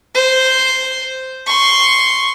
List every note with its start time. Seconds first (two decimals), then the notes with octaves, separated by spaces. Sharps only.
0.14 C5
1.47 C6 C#6